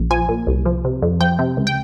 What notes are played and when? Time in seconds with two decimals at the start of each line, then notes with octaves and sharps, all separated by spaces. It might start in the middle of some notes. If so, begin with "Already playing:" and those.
Already playing: A#1
0.11 F3 G#5
0.29 A#2
0.47 C2
0.66 F3
0.85 C3
1.02 F2
1.20 F3 G5
1.39 C3
1.57 C#2
1.67 G5